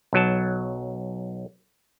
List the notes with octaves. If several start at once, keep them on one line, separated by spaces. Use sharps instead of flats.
B1 F#3 A5